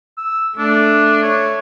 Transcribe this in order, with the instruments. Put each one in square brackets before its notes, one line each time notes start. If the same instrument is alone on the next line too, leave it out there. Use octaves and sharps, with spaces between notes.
[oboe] E6
[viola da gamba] A3 [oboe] D4
[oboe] C#5